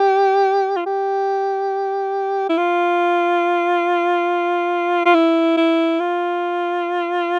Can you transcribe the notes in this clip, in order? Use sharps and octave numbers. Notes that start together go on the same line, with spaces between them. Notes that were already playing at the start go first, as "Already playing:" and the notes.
Already playing: G4
F4
G4
E4
F4
F4
E4
E4
F4